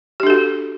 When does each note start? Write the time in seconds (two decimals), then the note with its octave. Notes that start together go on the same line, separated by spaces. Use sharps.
0.20 G4
0.23 D4
0.27 A4
0.30 F#4